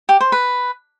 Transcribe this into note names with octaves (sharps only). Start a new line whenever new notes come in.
G4
C5
B4